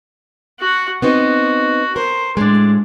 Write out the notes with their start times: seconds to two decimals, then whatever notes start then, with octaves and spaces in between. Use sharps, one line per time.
0.59 F#4 F#5
1.02 B3 C4 D#4 F#4
1.96 A#4 C5
2.37 A2 G#3 D4